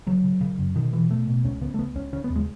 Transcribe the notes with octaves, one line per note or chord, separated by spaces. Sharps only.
C#3 F#3
C#3
C#3
F#2
B2 D#3
B2 E3
B2 A3
B2
C#2 C#4
C#3 B3
A3
C#2 B3
C#2 C#4
C#3 C#4
B3
D#2
G#3